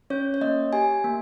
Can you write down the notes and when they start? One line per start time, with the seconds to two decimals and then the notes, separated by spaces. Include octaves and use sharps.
0.10 C#4 C#5
0.34 C#5
0.41 A#3 D#5
0.73 G4 G#5
1.04 A#3